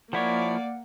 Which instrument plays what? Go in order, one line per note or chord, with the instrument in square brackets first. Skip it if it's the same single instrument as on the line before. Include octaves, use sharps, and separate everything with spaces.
[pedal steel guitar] F3 E4 C#5 [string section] A#3 [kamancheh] D5 [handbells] F#5